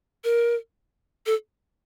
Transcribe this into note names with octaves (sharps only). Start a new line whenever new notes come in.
A#4
A4